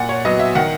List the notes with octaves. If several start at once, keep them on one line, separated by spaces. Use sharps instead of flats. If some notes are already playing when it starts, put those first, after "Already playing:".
Already playing: A#2 F#5
C#5
F#3 B3 D#5
E5
D#3 F#5